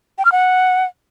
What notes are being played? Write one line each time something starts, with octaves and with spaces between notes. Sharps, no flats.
G5
F6
F#5